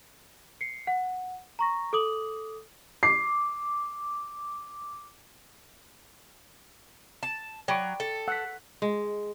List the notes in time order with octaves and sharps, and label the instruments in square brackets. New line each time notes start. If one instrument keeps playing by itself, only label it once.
[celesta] C7 C#7
F#5
A#5 C#6 A#6
A4 D6 D#6 F#7
[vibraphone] D6 [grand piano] C7
[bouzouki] A5
[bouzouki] F#3 [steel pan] D5 B5 C#6 [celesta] G5 D7
[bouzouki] A4
[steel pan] F#5 [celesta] E6 B6
[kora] G#3